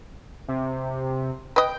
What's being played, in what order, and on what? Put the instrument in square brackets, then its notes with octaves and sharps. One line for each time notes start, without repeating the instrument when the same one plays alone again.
[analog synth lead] C3
[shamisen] B4 D#5 [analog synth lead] G5